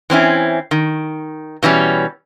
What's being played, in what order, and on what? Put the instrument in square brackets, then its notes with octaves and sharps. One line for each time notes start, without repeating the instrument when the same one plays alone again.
[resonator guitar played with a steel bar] E3 C4 C#4 E4
D#3
B2 E3 G3 C#4